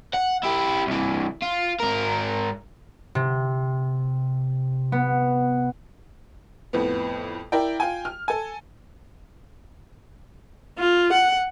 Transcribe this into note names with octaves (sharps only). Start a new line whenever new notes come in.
F#5
E4 G4
C2 E3
F4
G#2 A#4
C3
B3
F2 A2 B3
E4 A#4 D5 G5
F4 G5 G#5
F6
A4 G#5
F4
F#5